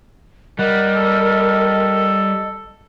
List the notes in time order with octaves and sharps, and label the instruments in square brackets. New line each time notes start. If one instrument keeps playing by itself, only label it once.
[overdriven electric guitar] G3 [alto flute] A#4 [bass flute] D#5 [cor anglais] F#5
[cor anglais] A4